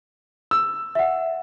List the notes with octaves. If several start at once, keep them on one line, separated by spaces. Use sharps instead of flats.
E6
E5 F#5